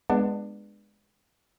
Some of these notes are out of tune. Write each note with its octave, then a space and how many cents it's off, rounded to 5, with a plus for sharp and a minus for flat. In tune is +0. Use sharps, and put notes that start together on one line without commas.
G#3 +0 B3 +0 D4 +25